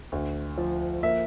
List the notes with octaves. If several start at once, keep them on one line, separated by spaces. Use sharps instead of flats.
D2
F3
A#3 E5